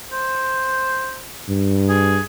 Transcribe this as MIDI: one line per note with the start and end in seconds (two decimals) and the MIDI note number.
0.12 1.19 72
1.48 2.20 43
1.89 2.21 68